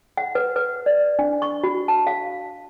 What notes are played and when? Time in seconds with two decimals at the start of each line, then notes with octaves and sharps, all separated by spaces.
0.17 F#5
0.35 B4
0.56 B4
0.86 D5
1.19 D4
1.42 C#6
1.63 F#4
1.88 A5
2.07 F5